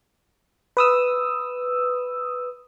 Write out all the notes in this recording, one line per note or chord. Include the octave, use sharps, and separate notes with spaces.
B4 D#6 E6